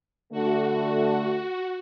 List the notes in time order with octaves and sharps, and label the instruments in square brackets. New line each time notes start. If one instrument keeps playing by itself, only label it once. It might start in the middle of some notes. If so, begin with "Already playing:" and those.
[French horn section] D3 A3 [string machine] F#4